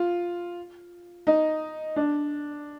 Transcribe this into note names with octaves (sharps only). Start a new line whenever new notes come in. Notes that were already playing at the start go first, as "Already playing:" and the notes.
Already playing: F4
D#4
D4